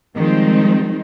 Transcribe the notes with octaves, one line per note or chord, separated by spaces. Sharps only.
D#3 F3 G3 G#3 C4 D#4